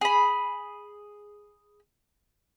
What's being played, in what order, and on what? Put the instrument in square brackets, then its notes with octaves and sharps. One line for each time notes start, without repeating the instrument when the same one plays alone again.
[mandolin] G#4 B5